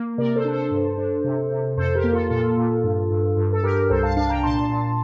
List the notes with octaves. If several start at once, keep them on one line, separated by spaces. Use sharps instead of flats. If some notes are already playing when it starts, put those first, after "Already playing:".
Already playing: A#3
C3 A#4 D5
A4 C5
D4
A4 C5
G2
D4
C3
C3
F2 A4 C5
G4 A#4
A#3
F4 A4
A#2 F4 A4
A#2
G2
G2
G2
A4
G2 G4 A#4
C2 A4 C5
F5 A5
D4 F5 A5
G5 A#5
A#2 A5 C6
A#2